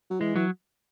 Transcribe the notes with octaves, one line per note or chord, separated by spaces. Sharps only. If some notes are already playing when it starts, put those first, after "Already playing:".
F#3
E3 G#3
E3 F#3